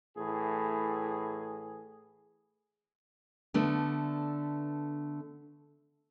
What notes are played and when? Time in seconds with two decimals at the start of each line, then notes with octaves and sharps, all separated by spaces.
0.17 A2 E3 G#4
3.54 D3 A3 B3 D4